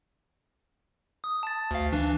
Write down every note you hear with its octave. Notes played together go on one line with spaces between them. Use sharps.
D#6
A5 A6
D2 F5
E3 D4